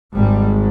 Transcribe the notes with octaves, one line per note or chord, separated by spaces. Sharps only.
G#1 G#2 G3